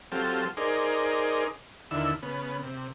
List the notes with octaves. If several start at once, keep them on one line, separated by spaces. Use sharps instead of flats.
F#3 C4 F4 G4 A4
D#4 G#4 A#4 C5 D5
D#2 D3 E4 E6
C#3 B3
C3